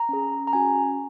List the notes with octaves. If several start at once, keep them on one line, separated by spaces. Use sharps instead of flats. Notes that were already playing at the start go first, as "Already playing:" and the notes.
Already playing: A#5
C#4 G#4
A#5
C#4 F#4 G#5